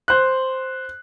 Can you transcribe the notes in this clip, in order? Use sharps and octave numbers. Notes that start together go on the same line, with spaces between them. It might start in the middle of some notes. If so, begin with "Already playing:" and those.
C5 F#6